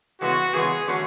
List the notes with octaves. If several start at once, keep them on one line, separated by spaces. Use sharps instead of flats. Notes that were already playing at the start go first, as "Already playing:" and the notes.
C#3 E3 G#3 B3 F#4
C#3 E3 G#3 B3 G#4
D3 F#3 A3 C#4